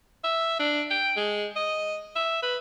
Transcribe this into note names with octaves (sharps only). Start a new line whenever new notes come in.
E5
D4
G5
G#3
D#5
E5
B4